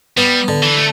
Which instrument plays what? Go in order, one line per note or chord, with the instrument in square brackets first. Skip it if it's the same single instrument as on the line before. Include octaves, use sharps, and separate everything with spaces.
[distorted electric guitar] G3 [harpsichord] B3
[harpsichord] D3
[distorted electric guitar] E3
A3